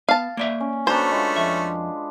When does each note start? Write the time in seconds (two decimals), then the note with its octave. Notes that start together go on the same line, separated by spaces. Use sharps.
0.09 B3 F5 A5
0.37 A#3 D5 E5
0.60 C#4
0.87 F#3 A3 C#4 D4 B4 C5
1.11 G#3 F4
1.36 F2 E5